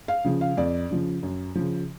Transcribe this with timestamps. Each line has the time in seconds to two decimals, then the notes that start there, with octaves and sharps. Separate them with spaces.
0.08 F5
0.24 C#3 F3
0.41 F5
0.57 F2 D5
0.90 C#3 F3
1.23 F#2
1.55 C#3 F3